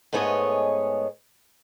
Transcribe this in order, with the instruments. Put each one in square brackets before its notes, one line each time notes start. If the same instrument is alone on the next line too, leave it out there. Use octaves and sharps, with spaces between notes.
[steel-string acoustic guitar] G#2 A3 B3 G#4 C#5 D#5